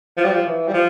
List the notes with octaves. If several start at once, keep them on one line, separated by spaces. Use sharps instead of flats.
F3
G3
F3
E3
G3
F3